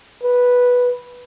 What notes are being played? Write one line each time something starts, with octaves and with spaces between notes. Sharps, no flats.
B4